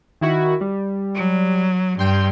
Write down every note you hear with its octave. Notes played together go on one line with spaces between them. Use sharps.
D#3 E4 F#4
G3
F#3
G2 G5 C6